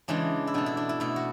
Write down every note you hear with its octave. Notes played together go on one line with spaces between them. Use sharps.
C#3 E3 G#3 D4
E4
B2 A3 D4
E4
D4
E4
B2 A3 E4
F#4